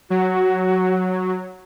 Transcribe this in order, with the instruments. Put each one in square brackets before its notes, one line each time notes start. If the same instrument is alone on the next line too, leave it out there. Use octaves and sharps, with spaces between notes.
[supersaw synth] F#3 [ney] F#4